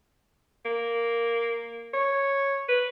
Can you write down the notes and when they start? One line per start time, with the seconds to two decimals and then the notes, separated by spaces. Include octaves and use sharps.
0.65 A#3
1.94 C#5
2.69 B4